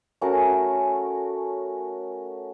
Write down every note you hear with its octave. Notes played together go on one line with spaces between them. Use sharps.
A3 C#4 F#4 A#4